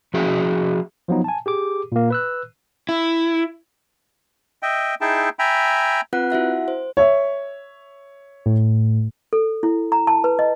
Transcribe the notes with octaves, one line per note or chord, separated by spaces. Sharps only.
F3 C#4 F#4 G#4 E5
F3 F#3 B3 D#4
G#5 A5
G4 G#4 D6
A#2 A#3
B4 E6 F#6
E4
D#5 E5 G5
D#4 E4 G#4 E5 G5 A5
E5 G5 G#5 A#5 B5
C4 F4 B4 F#5 F#6
E4 F#4 E5 F#5
C5
C#5 E5
A2
A4
E4
A#5
A5
B4
D#5